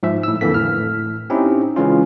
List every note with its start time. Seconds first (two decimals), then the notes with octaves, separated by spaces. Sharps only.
0.03 G#2 F3 E5
0.23 A2 E6
0.41 F2 D3 E3 A#3 A4 B6
0.54 A2 F6
1.30 C4 C#4 D#4 E4 G4
1.76 C#3 E3 G#3 C#4 F4